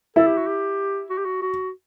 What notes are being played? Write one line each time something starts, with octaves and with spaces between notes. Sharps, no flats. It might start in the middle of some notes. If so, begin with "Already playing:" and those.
E4 A4
G4
F#4
G4
F#4
G4
F#4
F#4